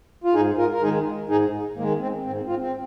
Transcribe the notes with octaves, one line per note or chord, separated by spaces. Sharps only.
F4
G#2 D#4 G#4
F4 A#4
A#4
D#3 G#3 D#4 G#4
G#2 D#4 G#4
D#3 G#3 A#3
C4
G#2 C4
C4 F4
C4